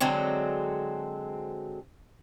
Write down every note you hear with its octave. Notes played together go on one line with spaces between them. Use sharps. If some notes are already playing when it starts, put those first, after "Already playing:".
D3 F#3 G#3 C4